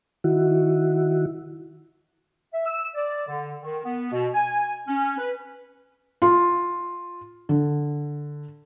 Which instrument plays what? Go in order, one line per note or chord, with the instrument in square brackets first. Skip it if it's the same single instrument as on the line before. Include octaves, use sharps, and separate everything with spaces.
[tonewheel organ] D#3 E4 F#4
[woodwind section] E5
E6
D5
D3
D#3
B3
B2
G#5
C#4
B4
[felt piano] F4
D3